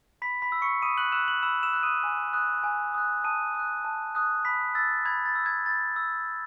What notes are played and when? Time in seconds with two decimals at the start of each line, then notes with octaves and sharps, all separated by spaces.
0.22 B5 B6
0.42 B5 B6
0.52 E6
0.62 C#6 C#7
0.82 B5 D#6 D#7
0.97 F#6 F#7
1.12 E6 F#6 E7
1.28 F#6 F#7
1.43 B5 E6 E7
1.63 E6 E7
1.73 F#6
1.83 D#6 D#7
2.03 G#5
2.33 D#6 F#6
2.64 G#5
2.94 D#6 F#6
3.24 A5 D#6 D#7
3.54 D#6 F#6
3.85 A5
4.15 D#6 F#6
4.45 B5 B6
4.75 E6 A6
5.05 B5 G#6
5.26 A6
5.35 E6
5.46 G#6
5.66 B5 A6
5.96 E6